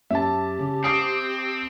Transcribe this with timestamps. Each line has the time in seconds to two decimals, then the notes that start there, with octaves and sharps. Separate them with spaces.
0.11 F#2 G4 E5 A5
0.59 C#3
0.84 C4 D6 D#6 C7